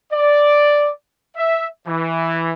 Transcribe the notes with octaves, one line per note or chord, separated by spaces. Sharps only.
D5
E5
E3